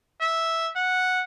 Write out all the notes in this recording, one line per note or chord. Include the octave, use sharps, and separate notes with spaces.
E5
F#5